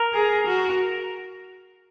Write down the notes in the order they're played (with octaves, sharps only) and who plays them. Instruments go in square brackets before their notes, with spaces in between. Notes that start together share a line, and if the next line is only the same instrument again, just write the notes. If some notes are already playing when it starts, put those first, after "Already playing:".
Already playing: [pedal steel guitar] A#4
[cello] G#4
F#4